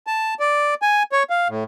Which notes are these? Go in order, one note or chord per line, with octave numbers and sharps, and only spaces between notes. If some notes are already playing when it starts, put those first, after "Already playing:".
A5
D5
G#5
C#5
F5
A2